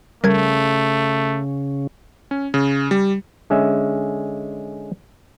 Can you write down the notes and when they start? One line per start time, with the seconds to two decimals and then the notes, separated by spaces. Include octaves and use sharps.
0.24 C#3 G3 A3 A#4 G#6
2.31 C#4
2.54 C#3
2.91 G3
3.50 D3 G#3 C#4 E5